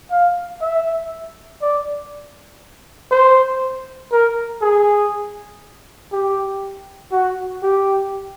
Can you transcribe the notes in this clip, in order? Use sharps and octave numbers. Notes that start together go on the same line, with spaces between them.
F5
E5
D5
C5
A#4
G#4
G4
F#4
G4